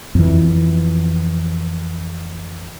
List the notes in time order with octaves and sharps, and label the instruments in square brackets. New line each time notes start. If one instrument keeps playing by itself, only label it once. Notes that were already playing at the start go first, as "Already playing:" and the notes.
[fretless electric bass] F2 E3